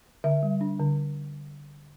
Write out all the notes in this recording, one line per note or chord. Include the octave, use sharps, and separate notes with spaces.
D3 E5
G3
D4
D3